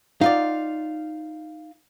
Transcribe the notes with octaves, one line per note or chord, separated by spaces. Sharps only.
D#4 F4 D5 F5